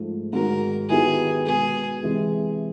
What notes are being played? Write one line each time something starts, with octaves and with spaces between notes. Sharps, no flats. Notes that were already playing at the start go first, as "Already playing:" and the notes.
Already playing: G#2 F3 A3
G#2 D#3 F#3 A#4
D#3 F#3 B3 E4 G4 G#4
B2 G#3 B3 G#4
C3 E3 G#3